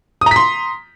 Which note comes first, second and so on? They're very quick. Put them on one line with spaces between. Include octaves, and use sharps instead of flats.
D#6 A#5 B6 C6